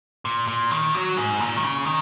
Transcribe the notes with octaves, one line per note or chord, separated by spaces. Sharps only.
A#2
A#2
D#3
F#3
G#2
A#2
D#3
C#3
D#3